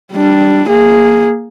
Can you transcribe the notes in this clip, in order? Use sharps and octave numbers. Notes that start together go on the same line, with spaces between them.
G3 D4
A#3 G#4